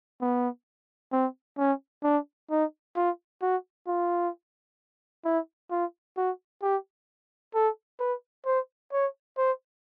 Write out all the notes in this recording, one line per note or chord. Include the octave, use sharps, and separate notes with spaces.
B3
C4
C#4
D4
D#4
F4
F#4
F4
E4
F4
F#4
G4
A4
B4
C5
C#5
C5